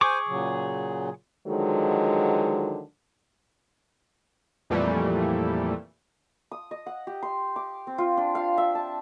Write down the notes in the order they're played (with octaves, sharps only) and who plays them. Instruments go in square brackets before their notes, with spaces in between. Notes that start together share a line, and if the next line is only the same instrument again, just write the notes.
[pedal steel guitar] G#4 C#6 D6 [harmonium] C5 G#5
[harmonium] A#2 C#3 F#3
[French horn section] D3 D#3 F3 F#3 G#3
[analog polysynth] F2 A#2 E3 G3 A3
[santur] D#6
D#5
F#5
G4
C6
D6
C4
F4
D4
F5
E5
A5